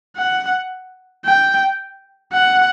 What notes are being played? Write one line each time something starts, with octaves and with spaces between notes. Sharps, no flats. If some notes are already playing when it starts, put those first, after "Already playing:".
F#5
G5
F#5